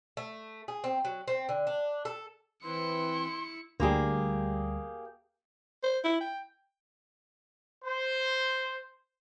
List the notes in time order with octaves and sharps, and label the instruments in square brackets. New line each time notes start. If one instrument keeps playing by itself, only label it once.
[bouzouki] A3
G#4
C4
F#3
C4
D3
D4
A4
[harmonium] E3 C4 B4 [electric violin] E4 C#7 [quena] C6
[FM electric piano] D2 G3 [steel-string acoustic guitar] A#3 G4 G#4
[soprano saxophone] C5
E4
G5
[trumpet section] C5